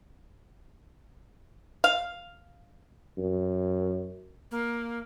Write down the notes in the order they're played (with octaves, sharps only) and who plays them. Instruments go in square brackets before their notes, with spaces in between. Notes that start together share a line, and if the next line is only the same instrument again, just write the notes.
[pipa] F5
[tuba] F#2
[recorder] A#3